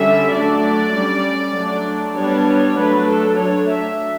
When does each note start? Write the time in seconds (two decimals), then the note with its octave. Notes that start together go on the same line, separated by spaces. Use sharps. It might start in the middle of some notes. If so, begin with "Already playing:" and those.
Already playing: D3 G3 C#4 E5
0.32 F#3 A3 D4 D5
0.93 G3 C#4
1.54 F#3 A3 D4
2.16 G3 B3 D4 C#5
2.77 F#3 A3 D4 B4
3.08 A4
3.38 F#3 A3 D4 C#5
3.69 E5